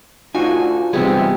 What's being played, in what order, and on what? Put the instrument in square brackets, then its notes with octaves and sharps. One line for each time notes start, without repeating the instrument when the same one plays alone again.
[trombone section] D2 D3 [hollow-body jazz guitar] D#4 F4 F#4 [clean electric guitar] G#5
[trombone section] G#2 C4 [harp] C3 E3 G#4 [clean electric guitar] G3 B3